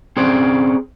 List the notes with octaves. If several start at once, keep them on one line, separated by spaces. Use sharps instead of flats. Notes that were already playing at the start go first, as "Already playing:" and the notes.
C4 C#4 G#4 C5 D5